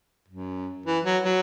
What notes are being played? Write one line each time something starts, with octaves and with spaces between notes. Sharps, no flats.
F#2
E3
F#3
F#3